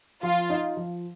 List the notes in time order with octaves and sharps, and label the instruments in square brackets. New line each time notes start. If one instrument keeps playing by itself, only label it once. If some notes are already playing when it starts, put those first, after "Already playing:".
[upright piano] F3 [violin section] F4
[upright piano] D#4
F3